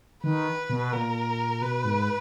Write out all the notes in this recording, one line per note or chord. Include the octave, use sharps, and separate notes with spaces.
D#3 B4
B2
A#2 A#4
B2 B4
G#2